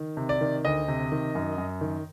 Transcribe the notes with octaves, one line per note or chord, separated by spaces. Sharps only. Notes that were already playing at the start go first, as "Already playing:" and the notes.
Already playing: D#3
C3
D5
D#3
D2 D#5
C3
D#3
F#2
F#2
D#3